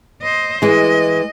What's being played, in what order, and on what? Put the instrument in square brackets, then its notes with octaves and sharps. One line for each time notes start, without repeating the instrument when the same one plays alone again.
[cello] C5 D#5
[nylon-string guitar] E3 G#3 [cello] D#5